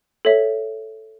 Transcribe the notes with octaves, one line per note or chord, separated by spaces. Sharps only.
A4 C#5 E5